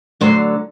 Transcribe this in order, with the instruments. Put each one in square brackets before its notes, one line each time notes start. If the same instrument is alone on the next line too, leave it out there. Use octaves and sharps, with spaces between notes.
[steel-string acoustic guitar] D2 D3 F#3 C5